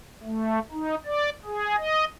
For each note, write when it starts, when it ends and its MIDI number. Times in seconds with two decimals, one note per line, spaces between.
0.24 0.59 57
0.72 0.95 63
1.05 1.29 74
1.45 1.76 68
1.77 2.05 75